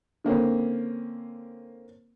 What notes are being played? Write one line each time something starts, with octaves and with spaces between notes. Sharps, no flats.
D3 A#3 C4 C#4